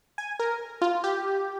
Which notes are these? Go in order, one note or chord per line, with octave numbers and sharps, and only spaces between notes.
G#5
A#4
F4
G4